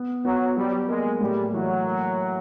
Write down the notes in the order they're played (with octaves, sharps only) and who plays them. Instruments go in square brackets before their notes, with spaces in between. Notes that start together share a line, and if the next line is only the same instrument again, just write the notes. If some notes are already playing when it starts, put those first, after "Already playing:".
Already playing: [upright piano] B3
[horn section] F#3 [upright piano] B3
[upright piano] F#3 [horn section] G3
[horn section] G#3 [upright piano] A#3
[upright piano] A2 [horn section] G3
[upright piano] E3 [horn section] F#3
[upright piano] A#3